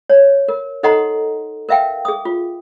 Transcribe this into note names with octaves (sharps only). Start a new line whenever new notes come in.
C#5
A#4
D#4 A4 D#5 F#5 A#5 C6
A#4 B4 E5 F5 G5
G#4 D#6
F4